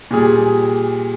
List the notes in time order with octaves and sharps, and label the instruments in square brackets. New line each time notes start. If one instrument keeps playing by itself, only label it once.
[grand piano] A#2 G3 G#4